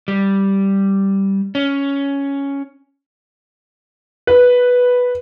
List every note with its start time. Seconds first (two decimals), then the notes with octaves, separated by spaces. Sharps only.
0.08 G3
1.55 C#4
4.27 B4